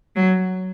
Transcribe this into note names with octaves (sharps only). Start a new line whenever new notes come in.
F#3